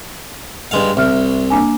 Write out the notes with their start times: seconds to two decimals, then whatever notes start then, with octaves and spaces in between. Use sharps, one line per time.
0.71 G2 G#3 F5
0.97 C2 E5 F6
1.50 A#3 D4 G#5